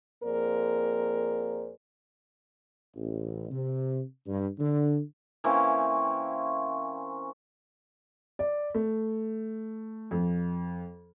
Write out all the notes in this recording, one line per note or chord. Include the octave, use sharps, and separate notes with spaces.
F2 A#3 G#4 A#4 C5 D5
A1
C3
G2
D3
E3 A#3 C4 C#4
D5
A3
F2